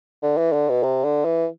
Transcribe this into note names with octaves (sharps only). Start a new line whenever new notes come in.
D3
E3
D3
B2
C3
D3
E3